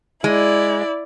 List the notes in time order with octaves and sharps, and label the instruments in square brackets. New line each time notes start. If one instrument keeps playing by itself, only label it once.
[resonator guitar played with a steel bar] G#3 [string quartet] E4 D5